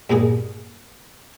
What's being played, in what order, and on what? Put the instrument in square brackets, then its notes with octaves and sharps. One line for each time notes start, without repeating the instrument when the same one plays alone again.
[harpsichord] G2 A#2 A#3 G#4